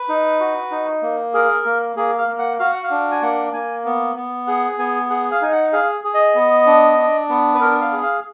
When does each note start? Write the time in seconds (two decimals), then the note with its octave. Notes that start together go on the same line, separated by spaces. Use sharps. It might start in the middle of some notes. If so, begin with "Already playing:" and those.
Already playing: B4
0.09 D#4
0.40 F#4
0.71 D#4
1.03 A#3
1.34 G#4 A#4
1.65 A#3
1.96 A#3 G#4
2.18 F5
2.28 A#3
2.39 F#5
2.59 F#4 F5
2.72 F#5
2.83 F5
2.91 D4
3.12 G#5
3.22 A#3 F#5
3.53 A#3 G#5
3.85 B3
4.16 B3
4.47 G#4 F#5
4.78 B3 G#5
5.10 G#4 F#5
5.32 F5
5.42 D#4 G#5
5.52 F#5
5.73 G#4 F5
6.04 G#4
6.14 D#5
6.35 B3
6.67 D4
6.98 D4
7.29 B3
7.55 B4
7.61 D4 A#4
7.81 F5
7.92 G#4
8.03 F5